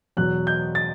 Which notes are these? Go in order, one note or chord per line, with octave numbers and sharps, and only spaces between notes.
E2 B2 F#3 F#6
G6
A6